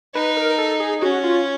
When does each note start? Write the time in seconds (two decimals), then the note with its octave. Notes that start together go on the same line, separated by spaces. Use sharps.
0.15 D#4 B4
0.37 A#4
0.58 A4
0.80 G#4
1.02 C#4 F#4
1.23 F4